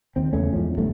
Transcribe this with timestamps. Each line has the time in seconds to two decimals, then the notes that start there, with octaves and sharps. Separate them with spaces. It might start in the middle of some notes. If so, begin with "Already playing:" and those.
0.16 D#2 C4
0.33 E2 C#3 A3 C#4
0.52 E2 G#2 F3
0.78 F#1 E2 G2 A3